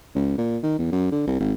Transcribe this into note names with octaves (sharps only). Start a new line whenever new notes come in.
C#2
A#2
D#3
E2
F#2
D3
C2
G#1